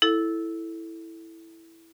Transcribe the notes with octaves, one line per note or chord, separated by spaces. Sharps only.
E4 A4